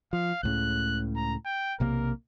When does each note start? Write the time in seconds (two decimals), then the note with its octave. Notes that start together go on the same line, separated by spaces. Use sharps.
0.13 F3 F5
0.43 C#2 A2 C#3 F#6
1.16 A#5
1.46 G5
1.80 B1 C3 A#3 A#4